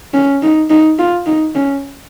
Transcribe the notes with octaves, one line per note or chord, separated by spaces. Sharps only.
C#4
D#4
D#4
F4
D#4
C#4